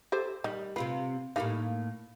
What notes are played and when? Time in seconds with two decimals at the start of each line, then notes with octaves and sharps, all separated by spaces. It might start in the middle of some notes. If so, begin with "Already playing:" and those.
0.12 G4 A4 C5
0.44 D#3 G3
0.76 C3 C4 F4 B4
1.36 A2 G3 A#3 D4 D#4 F5